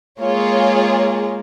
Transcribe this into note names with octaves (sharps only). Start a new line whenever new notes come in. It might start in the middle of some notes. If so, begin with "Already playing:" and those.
G#3 A#3 F4 G#4 C#5